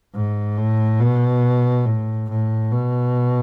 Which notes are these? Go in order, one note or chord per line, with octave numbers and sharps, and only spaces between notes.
G#2
A2
B2
A2
A2
B2